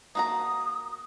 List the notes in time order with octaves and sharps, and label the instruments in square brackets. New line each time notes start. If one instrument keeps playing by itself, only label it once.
[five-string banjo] A#3 F#4 A#5 [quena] D#6